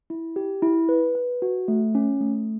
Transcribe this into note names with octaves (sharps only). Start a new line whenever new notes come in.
E4
G4
E4
B4
B4
F#4
A3
C#4
A3